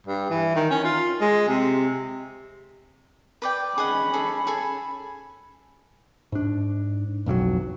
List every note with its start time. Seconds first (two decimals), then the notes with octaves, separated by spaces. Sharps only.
0.07 G2
0.30 E3
0.56 D#3
0.71 C#4
0.84 F4
1.21 G#3
1.48 C3
3.42 B4 D5 G5
3.78 C#4 G#4 D#5 F#5 B5
4.13 G#4 A4
4.47 G#4 A4 G#5
6.32 G#2 D4
7.26 B1 F2 E3 F#3